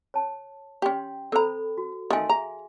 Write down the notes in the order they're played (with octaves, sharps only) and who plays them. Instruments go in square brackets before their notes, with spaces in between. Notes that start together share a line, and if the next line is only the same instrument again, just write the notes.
[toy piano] C#5 A5
[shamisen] C#4 G4 [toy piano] G5 C6
[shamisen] C4 A#5 [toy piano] A4 C5 B5
[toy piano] F#4
[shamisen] D#3 A3 [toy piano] F5 G#5 C6
[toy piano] G#4 E5 [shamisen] A#5